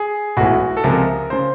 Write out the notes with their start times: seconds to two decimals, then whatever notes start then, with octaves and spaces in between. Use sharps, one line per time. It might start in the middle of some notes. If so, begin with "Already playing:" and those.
Already playing: G#4
0.37 B1 A2 E3 G#3 F#4
0.77 A4
0.84 C#2 C3 F3 G#3 A#4
1.30 C#3 C5